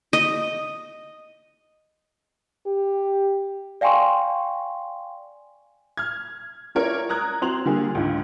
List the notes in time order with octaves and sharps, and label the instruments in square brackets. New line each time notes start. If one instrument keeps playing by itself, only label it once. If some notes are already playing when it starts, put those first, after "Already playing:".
[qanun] D#5
[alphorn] G4
[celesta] D5 F5 G5 G#5 C6 C#6
[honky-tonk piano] F6 G#6
C#4 E4 F4 A#4 C#5 D5
A#5 D#6 F#6 G#6
C4 F#4 C5 F7 F#7
D3 G3 A#3 G#4
C#2 G#2 D3